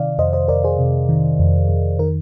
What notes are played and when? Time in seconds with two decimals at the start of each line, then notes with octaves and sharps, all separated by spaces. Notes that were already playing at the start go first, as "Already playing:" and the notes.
Already playing: C3 D#3 D5 F5
0.18 F2 C5 D#5
0.33 C5 D#5
0.48 F2 A#4 D5
0.64 G#4 C5
0.79 C3
1.09 D#3
1.39 F2
1.69 F2
1.99 D#3 A#4